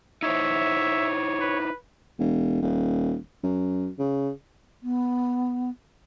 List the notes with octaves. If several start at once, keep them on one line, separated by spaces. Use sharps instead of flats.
D#4 E4 C5 C#5 E5
B4
E1
D#1
F#2
C#3
B3